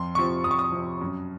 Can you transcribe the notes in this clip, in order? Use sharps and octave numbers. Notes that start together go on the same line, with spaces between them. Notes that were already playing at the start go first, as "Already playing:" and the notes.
Already playing: F2 C6
C3 F3 C#6
F2 D#6
C#6
D#6
C3 F3
F#2